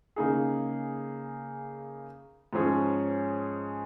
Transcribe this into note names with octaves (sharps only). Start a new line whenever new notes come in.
C#3 A#3 D#4 G#4
G#2 F3 C#4 G#4 C#5